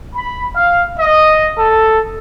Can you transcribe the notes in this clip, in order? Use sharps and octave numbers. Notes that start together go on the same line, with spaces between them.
B5
F5
D#5
A4